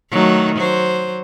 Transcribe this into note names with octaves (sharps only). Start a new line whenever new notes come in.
D#3 F#3 A3
F#3 C5